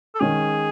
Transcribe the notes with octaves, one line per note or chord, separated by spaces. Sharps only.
A4
D#3 G#3 C#4 G#4